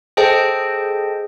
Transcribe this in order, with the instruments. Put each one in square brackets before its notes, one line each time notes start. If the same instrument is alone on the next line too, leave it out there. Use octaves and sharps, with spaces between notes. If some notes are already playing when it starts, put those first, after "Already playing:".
[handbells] G#4 A4 C5 D#5 G5 A5